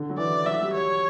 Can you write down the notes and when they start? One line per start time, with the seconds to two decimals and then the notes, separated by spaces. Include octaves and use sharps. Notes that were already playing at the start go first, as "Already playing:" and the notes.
Already playing: D3
0.09 F#3
0.18 E3 D5
0.46 F#3 E5
0.61 G3
0.74 C#5